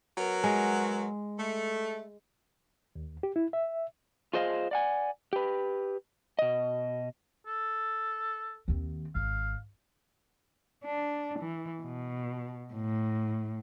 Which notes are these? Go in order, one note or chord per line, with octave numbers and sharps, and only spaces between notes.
F#3 B3 A#4
G#3
A3
D#2
G4
E4
E5
F4 G#4 C5 D#5 F5
D5 F#5 G#5
G4 B4
B2 D#5
A4
D#2 C4
G#1 F5
D4
E3
B2
A2